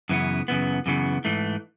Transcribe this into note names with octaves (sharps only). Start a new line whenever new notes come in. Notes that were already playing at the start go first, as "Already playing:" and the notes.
F#2 C#3 E3 B3
F#2 C#3 E3 B3
F#2 C#3 E3 B3
G#2 E3 A3